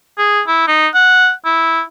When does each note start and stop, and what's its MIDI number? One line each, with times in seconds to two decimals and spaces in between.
0.18 0.42 68
0.48 0.67 64
0.68 0.88 63
0.94 1.31 78
1.45 1.82 64